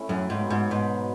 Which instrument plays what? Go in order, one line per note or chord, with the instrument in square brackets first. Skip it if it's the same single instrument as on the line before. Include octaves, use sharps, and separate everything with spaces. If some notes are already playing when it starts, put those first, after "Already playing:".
Already playing: [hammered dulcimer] A3 C#4 E4
[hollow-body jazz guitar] F#2 [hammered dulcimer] A2
[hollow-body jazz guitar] G#2
[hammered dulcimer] F#3 B3 D#4
[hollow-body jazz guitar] G#2
[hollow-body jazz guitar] G#2 [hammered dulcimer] B2